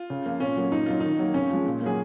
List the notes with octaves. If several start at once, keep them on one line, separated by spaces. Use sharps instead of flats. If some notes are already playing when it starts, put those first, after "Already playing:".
Already playing: F4
C#3
F3 A#3
A#2 C#4
F#3 A#3
A#2 D#4
F#3 A#3 F4
D#3 D#4
F#3 A#3
C#3 C#4
F3 G#3
A#2
F#3 A#3 G#4